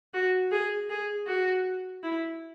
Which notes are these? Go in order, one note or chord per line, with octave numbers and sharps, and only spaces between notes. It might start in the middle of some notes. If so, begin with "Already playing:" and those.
F#4
G#4
G#4
F#4
E4